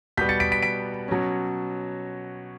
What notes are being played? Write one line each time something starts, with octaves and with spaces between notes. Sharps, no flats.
B2 G3 B3 G6 B6
A6 C#7
B6 D7
B6 D7
B6 D7
B2 F#3 C#4